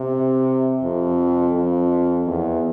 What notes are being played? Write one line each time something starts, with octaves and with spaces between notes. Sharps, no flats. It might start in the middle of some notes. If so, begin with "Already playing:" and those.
Already playing: C3
F2
F2
E2